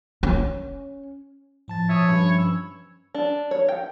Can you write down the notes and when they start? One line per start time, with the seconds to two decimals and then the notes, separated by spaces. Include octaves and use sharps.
0.23 C#4
1.68 A2 F3 A5 A6
1.89 A#2 C#5 E5 A5 D#6
2.08 G2 C#4 B5
2.38 E6
3.15 D4
3.51 C#5
3.68 G5